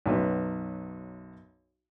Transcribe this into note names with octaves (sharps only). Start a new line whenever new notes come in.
B1 F#2 F#3 B4